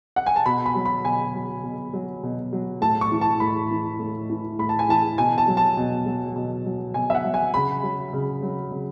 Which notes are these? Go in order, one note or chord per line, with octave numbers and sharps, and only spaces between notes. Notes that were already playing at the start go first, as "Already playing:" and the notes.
F#5
G#5
A5
B2 B5
B5
F#3
B5
B2 G#5
F#3
B2
F#3
B2
F#3
A2 A5
C#6
E3
A5
A2 B5
E3
A2
E3
A2 B5
A5
G#5
E3 A5
B2 G#5
A5
F#3
A5
B2
F#3
B2
F#3
B2 G#5
E5
F#5
F#3
G#5
C#3 B5
F#3
C#3
F#3
C#3